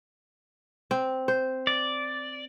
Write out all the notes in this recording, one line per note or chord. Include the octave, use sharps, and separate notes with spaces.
C4
C5
D5